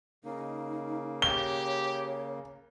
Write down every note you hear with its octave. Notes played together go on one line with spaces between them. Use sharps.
C#3 A#3 D#4
G4 C#5 G7